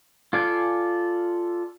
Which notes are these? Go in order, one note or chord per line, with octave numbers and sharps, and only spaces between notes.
F4 A4 D5 F5 G#5